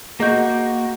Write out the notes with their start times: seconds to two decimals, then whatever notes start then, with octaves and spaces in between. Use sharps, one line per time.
0.20 A#3 F#4 G#4 D#5 G6